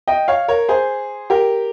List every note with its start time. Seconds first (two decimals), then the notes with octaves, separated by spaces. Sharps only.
0.07 D#5 G5
0.28 C#5 F5
0.48 A#4 C#5
0.69 G#4 C5
1.30 G4 A#4